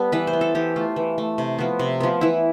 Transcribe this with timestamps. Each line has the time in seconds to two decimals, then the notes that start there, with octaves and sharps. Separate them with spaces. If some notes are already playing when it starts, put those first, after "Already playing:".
Already playing: G3 B3 A4
0.12 E3 B4
0.27 C5
0.33 B3
0.41 A4
0.55 E3 G4
0.76 A3 F4
0.96 E3
1.18 A3
1.38 C3
1.59 F3 B3
1.79 C3
2.00 F3 B3
2.21 E3 E4